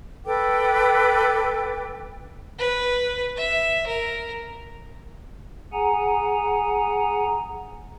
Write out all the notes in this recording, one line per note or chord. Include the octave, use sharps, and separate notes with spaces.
A4 B4 G5 D6
B4
E5
A#4
G#4 F#5 G#5 A#5